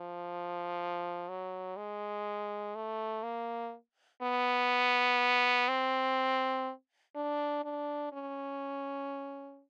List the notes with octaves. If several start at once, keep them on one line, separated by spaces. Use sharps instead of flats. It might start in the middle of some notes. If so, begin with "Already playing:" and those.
Already playing: F3
F#3
G#3
A3
A#3
B3
C4
D4
D4
C#4